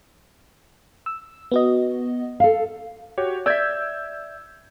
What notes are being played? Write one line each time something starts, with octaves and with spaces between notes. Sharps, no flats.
E6
B3 F#4 D#5
A4 F5
F#4 G4 C#5
D5 E5 E6 G6 G#6